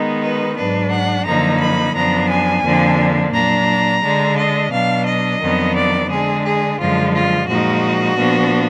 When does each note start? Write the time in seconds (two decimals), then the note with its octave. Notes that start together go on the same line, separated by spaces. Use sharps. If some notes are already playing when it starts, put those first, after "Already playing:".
Already playing: D#3 G#3 B3 D#4
0.22 B4
0.56 G#2 F#3 D4 B4
0.91 F#5
1.26 F#2 D3 F3 A#3 D#4 A#5
1.60 B5
1.95 F#2 F3 B3 D4 A#5
2.29 G#5
2.64 F2 D3 F3 A#3 D4
3.33 A#2 F#3 D4 A#5
4.02 D3 G#3 D4
4.37 D#5
4.71 B2 F#3 D4 F5
5.06 D#5
5.41 F2 D#3 F#3 B3 D4
5.75 D5
6.10 D3 G#3 D4 G#4
6.44 G#4
6.79 F#2 D3 F3 G#3 F4
7.14 F4
7.48 A#2 F3 G#3 D#4 F#4
8.17 A#2 F3 B3 D4